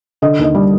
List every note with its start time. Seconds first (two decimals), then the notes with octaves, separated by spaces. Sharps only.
0.22 D3 D#5
0.39 D#2 D#5
0.55 G3